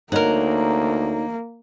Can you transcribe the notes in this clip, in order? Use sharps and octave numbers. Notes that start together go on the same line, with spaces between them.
D2 A#3 D#4 A#4 C#5 D#5 F#5